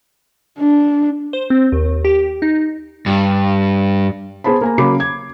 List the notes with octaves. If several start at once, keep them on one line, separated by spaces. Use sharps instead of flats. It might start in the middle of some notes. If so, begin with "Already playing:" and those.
D4
C5
C4
D#2
G4
D#4
G2
B3 G#4 C5 A5 B5
A#3 G#5 A#5
C#3 F#3 A#3 B5 D6 C7
G#6